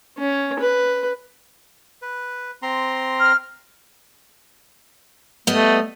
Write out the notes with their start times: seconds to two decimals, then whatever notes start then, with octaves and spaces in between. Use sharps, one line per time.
0.18 C#4
0.60 B4
2.02 B4
2.62 C4 A#5 C6
3.20 F6
5.47 G3 A3 B3 D#5